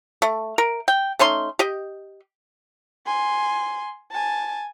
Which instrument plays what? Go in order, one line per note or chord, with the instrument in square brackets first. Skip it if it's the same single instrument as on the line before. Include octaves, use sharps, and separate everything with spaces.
[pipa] A3
A#4
G5
A3 C#4 D#4 C6
G4 D#5
[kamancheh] G#5 C6
G#5 A5